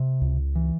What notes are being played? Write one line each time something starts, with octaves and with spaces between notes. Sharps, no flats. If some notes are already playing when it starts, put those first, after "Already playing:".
Already playing: C3
C#2
E3